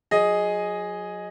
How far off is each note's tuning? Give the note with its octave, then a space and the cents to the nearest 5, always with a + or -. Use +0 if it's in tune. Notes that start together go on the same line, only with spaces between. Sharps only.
F#3 -35 G#4 +0 D#5 +0